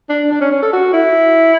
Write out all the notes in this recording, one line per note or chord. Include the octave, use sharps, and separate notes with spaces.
D4
D4
C#4
C#4
A4
F#4
E4